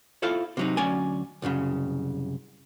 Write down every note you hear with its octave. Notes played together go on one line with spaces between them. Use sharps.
E4 F4 A4 C5 E5 F5
C3 F#3 D#4
D2 F#3 C#4 D5 G#5
C2 F#2 A2 C#3